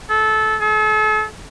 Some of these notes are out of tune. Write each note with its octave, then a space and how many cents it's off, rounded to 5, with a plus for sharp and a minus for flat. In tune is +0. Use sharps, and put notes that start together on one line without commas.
A4 -20
A4 -40